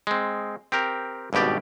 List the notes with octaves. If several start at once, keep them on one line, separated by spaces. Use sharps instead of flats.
G#3 C4
C4 G4 A#4
G#1 G2 B2 G4 D5